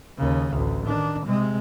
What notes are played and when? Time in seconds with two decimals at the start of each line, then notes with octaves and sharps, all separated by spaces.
0.18 D#2 C#3
0.53 A1 D2
0.87 D#3 D4
1.26 C3 G#3